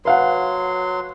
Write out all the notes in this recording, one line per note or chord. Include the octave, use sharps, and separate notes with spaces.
F#3 B4 F5 F#5 C6